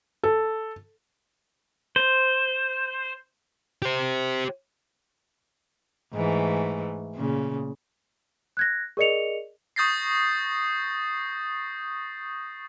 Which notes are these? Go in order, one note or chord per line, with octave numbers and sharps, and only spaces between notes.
A4
C5
G4 C5
G#2 E3 A3
A#2 C#3
F#6 G#6 A#6
G#4 A#4 D5 D#5 C#7 F7
C#6 D#6 G6 A6 A#6 C7